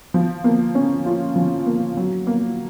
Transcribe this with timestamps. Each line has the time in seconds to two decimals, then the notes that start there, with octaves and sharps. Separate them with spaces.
0.14 F3
0.44 A#3
0.75 C#4
1.06 F4
1.36 F3
1.66 A#3
1.97 F#3
2.27 A#3